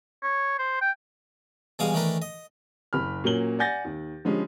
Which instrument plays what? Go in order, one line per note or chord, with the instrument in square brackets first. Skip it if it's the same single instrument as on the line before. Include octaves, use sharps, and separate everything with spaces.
[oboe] C#5
C5
G5
[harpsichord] B2 E3 G3 G#3 F5 D#6
D#3 E3 A3 D4 A#4 B4
D#5
[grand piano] F#1 B5 F6
A#2 F#3 A#3 C#4 F#7 G7
D5 F#5 G#5 G6 A6 A#6
D#2
D3 F3 G3 G#3 C#4